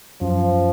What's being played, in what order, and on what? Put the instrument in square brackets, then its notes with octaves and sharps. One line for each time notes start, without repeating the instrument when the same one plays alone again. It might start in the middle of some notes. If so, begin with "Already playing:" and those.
[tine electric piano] F#2 [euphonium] F3